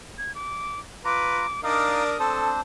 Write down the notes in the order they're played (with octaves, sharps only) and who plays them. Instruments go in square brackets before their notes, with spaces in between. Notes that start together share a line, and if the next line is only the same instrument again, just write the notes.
[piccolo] G#6
D6
[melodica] F4 A#5 [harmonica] B4 [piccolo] D6
[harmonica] D4 A#4 D5 [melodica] D#4 D#5 F5 [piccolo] D#6
[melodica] C4 D4 C5 [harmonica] A4